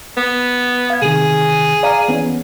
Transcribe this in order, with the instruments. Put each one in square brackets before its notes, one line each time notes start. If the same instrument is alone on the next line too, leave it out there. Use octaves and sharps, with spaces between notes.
[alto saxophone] B3
[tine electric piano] F5 G#6
[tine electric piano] C3 D#3 [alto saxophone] G#4
[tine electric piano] D5 F5 A#5
E3 B3 C#4